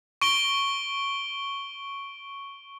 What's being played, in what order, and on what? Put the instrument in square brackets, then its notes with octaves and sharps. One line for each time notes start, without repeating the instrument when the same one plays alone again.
[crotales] C#6 D7 G7